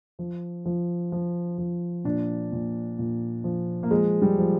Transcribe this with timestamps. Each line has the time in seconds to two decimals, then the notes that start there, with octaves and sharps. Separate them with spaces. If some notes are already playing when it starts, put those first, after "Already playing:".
0.19 F3
0.65 F3
1.12 F3
1.58 F3
2.04 A#2 D4
2.52 A#2
2.99 A#2
3.44 F3
3.83 A#3
3.91 F3 G#3
4.22 G3
4.38 F3